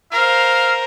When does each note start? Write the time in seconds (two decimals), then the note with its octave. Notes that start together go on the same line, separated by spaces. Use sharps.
0.12 A#4 C5 F5